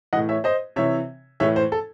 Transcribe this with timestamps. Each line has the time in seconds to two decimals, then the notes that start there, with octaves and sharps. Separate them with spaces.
0.13 A2 E3 D#5 F#5
0.29 C#5 E5
0.44 C5 D#5
0.76 C3 E3 C#5 E5
1.40 A2 E3 C#5 E5
1.56 C5
1.72 A4